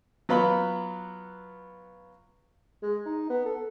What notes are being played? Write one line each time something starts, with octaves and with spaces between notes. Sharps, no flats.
F#3 B3 F4 B5
G#3
D#4
B3
A4